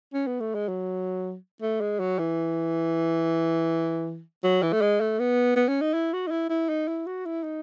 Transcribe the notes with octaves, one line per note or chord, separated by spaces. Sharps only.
C#4
B3
A3
G#3
F#3
A3
G#3
F#3
E3
F#3
E3
A3
G#3
A3
B3
B3
C#4
D#4
E4
F#4
D#4
E4
E4
D#4
E4
F#4
E4
D#4